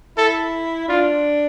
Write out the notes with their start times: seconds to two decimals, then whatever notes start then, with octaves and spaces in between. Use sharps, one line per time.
0.17 E4 A4
0.88 D4 F4